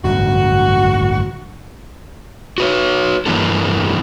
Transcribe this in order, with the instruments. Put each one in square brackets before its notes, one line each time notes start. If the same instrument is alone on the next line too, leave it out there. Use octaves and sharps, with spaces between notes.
[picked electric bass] A1 G2 D3 [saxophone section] F#4
[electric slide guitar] F#4 B4 C#5
G2 E3 A#3 D4 A4